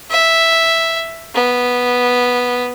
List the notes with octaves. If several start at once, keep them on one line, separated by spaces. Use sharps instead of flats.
E5
B3